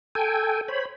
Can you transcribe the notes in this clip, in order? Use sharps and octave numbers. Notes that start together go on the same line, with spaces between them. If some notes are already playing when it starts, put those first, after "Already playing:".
A4 G5 G#5
C5 C#5 B5